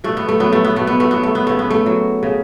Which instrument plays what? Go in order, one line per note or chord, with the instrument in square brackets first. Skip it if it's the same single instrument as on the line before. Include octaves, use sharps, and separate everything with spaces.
[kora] B2 A3
B3
A3
F#3 B3
A3
B3
B2 A3
B3
A3
F#3 B3
A3
B3
C#3 A3
B3
A3
F#3
C#3